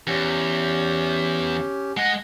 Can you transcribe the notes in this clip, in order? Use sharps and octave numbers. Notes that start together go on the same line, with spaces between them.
E2 C#4 G4
G#3 D#5 F#5